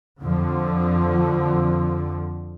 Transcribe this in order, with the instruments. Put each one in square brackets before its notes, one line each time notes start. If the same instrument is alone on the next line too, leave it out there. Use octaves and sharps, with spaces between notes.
[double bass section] F2 D3 F3